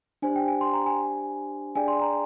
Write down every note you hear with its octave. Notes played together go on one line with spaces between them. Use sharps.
D4 G4 C5 G#5
G5
G#5
C6
A#5
G#5
D4 G#4 D5 G5 G#5
C6
A#5